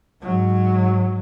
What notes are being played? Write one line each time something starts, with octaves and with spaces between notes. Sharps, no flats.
G#2 F#3